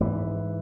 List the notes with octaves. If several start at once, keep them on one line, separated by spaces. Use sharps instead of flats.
G#2 E3